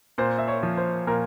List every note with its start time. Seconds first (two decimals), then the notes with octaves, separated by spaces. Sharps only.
0.18 A#2 C5
0.38 E5
0.48 C#5
0.63 F3
0.77 C5
1.07 A#2 A#4